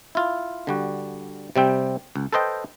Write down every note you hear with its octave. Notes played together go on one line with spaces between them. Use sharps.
E4 F4
D3 G3 F#4
C3 G3 C4 G5
C#2
A4 B4 C5 D#5 G5